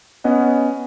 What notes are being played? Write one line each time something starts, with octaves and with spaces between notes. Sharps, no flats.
B3 C#4 D#5 F#5